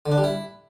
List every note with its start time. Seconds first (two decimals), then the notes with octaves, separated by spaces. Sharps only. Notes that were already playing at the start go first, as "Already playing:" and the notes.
0.06 D3
0.12 D4
0.18 G3
0.24 E4